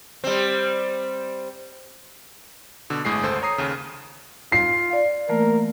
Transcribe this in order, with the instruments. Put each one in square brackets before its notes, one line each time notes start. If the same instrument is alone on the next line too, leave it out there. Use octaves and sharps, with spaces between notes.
[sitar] G3 C4
[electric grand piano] B2 D3
G1 A2 G#3 G#4 C7
G#1 D2 A4 C5 C7
C#5 A#5 D#6 C7
D#2 C#3
[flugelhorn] F4 [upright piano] C7
[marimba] D5 F5
[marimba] E3 A3 A#3 [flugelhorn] A#4